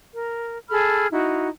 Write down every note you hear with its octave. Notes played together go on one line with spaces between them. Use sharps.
A#4
G#4 A4 B5 F6
D#4 E4 F#4